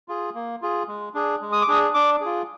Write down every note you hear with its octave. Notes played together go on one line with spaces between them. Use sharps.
F4 G#4
A#3
F4 G#4
G#3
D4 G#4
G#3
D#6
D6
D4 G#4 D#6
D4 D6
F4 G#4